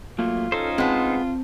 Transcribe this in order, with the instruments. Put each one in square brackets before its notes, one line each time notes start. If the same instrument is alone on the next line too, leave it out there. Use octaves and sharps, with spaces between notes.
[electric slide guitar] F#3 A3 A#3 [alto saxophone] F4
[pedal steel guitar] C#4 D#4 C5 [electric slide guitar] A4
[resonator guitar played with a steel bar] G#3 B3 [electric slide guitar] C4 A5